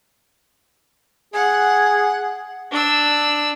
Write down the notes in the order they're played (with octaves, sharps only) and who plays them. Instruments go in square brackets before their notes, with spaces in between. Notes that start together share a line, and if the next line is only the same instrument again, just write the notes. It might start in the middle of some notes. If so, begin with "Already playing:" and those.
[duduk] G#4 [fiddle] F#5
[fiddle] D4 E6